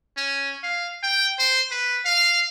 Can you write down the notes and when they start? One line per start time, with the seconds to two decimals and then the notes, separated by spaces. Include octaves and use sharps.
0.17 C#4
0.63 F5
1.03 G5
1.39 C5
1.71 B4
2.05 F5